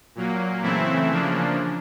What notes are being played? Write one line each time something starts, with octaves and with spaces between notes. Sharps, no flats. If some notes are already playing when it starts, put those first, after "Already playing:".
A#2 F#3 A#3
C#3 E3 A3 C4 E4
C#3 F3 A#3 D4